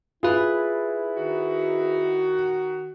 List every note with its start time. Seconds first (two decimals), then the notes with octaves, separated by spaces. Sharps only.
0.23 E4 F4 G#4 B4
1.17 D#3 F#4